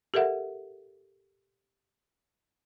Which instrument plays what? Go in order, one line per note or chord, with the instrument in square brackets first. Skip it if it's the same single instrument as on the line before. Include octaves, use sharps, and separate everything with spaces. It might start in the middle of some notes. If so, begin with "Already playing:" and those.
[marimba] G4 A4 A#4 E5 F#5